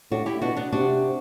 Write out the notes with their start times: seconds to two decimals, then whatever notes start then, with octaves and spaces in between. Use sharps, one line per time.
0.11 A2 D4 F#4
0.26 E4 G4
0.42 B2 D4 F#4
0.57 B3 D4
0.72 C3 D4 F#4